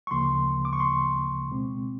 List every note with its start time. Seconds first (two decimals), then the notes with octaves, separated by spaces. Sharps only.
0.07 C#6
0.11 D2 C#3 F3 A#3 C6
0.65 D6
0.73 C#6
0.80 C6
1.50 B2 G#3 C4